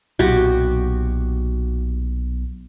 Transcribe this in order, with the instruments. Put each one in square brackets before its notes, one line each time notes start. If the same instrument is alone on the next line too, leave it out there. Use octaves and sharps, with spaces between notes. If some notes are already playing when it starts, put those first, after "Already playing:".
[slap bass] B1 A#2 [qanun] F#4 G4